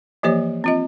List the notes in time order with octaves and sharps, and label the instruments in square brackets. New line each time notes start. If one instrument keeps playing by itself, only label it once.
[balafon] E3 F3 A#3 G4 C5 C#5
C4 F4 D#5